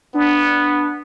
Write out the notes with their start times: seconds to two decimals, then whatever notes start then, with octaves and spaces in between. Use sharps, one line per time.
0.14 B3 D4